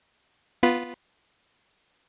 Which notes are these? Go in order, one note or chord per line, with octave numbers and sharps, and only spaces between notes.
B3 F4 B5